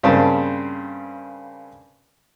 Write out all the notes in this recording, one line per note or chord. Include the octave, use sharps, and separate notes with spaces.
G2 C#3 A#3 C4 A5